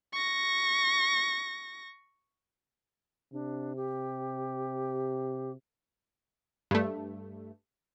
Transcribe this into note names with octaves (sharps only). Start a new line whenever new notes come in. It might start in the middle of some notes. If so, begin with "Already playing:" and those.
C#6 A#6
C3 D4
G4
G2 A3